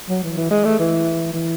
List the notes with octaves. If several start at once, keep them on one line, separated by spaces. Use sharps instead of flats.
F#3
E3
E3
G#3
A3
E3
E3